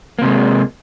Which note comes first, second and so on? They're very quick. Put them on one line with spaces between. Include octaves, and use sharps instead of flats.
A#3 C3 G#3